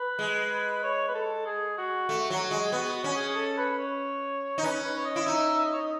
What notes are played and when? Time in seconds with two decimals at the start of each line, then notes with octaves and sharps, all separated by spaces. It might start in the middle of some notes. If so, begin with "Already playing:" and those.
Already playing: B4
0.19 G#3
0.83 C#5
1.08 B4
1.15 A4
1.46 G#4
1.78 F#4
2.09 A3
2.30 F#3
2.51 G#3
2.64 G#4
2.72 B3 F#4
2.93 F#4
3.04 C#4
3.15 G#4
3.35 A4
3.57 B4
3.79 C#5
4.58 D#4
4.63 C#4 B4
4.84 B4
4.97 C#5
5.04 D#5
5.16 E4
5.25 D#4 E5
5.58 E5
5.65 D#5
5.73 C#5
5.81 D#5